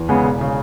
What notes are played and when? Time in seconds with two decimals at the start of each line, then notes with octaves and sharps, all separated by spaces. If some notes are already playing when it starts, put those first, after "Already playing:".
Already playing: E2
0.09 C#3 E3 G#3 B3
0.25 E1
0.41 C#3